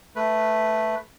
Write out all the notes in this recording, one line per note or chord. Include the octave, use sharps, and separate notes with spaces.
A3 B4